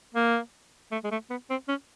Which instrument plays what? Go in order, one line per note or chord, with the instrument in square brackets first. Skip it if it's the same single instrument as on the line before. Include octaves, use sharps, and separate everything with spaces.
[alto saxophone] A#3
A3
G#3
A3
B3
C4
C#4